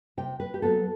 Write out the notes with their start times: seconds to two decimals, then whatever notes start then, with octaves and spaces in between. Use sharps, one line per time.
0.17 C3 G5
0.40 B4
0.54 G4
0.62 F#3 B3 A4